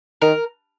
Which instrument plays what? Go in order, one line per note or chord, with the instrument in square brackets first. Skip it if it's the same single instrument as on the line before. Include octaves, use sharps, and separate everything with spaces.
[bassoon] D#3 [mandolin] A#4